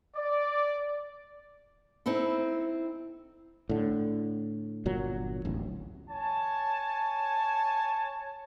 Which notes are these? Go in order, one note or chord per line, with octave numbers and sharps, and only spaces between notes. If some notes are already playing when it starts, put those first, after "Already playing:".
D5
C4 D#4 E4 A4
A2 D3
G1 A#2 F#3
D1 A1
C#5 G#5 A5